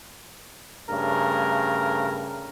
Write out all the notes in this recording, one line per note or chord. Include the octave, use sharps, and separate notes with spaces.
G2 C#3 A3 A#4